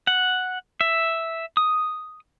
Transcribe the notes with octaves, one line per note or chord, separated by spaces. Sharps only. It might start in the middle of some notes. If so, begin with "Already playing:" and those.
F#5
E5
D#6